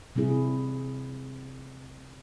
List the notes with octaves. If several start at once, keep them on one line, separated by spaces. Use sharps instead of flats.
C3 G3 C4 E4 G#4